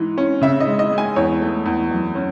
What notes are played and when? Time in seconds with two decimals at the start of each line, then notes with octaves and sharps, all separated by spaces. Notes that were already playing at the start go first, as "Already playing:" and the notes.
Already playing: G#2 E3
0.18 C#4
0.41 C#3 E5
0.60 D#5
0.67 G#3
0.79 D#5
0.92 G#3
0.98 G#5
1.16 E2 C#5
1.41 A3
1.66 E2
1.91 F#2
2.15 C#4